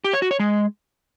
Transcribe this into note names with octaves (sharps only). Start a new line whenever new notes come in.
G4
C#5
F#4
C#5
G#3